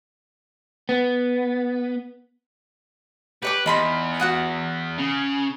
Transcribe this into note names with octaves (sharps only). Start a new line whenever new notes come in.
B3
G4 B4 C#5 D6
E2 D#4 B5 C6
F#4 F#5 D#6
C#3